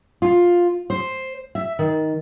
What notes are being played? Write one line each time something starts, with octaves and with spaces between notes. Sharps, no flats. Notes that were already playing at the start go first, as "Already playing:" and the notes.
F4
C5
E5
D#3